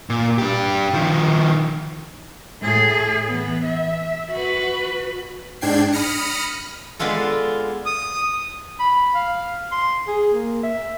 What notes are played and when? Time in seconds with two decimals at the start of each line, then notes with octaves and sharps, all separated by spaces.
0.10 A#2
0.38 D4 G4
0.94 D#3 F3
2.61 A2 G#4
3.26 E3 B3
3.65 E5
4.32 F#4 B4
5.61 G#2 D4 G5 G#6 C7
5.92 B5 D#6 F6 A#6 C#7
6.99 G#3 B3 D4 F4 A4
7.86 D#6
8.80 B5
9.15 F5
9.72 C6
10.07 G#4
10.33 A#3
10.63 E5